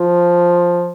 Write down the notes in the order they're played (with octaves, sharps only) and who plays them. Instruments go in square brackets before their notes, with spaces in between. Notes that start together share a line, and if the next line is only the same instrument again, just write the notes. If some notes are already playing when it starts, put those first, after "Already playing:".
Already playing: [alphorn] F3